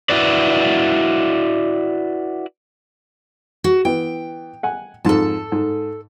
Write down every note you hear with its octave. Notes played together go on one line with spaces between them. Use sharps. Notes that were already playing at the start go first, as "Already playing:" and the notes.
E4 F#4 B4 D5
F#4
E3 B3 G5
F#5 G#5
F2 G#2 A4 A5
G#2